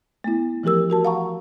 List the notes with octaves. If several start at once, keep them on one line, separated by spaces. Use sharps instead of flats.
A3 B3 E4
E3 F3 A3 G4 A#4 E6
F#4 A#4 A5
F5 F#5 A5 A#5 C#6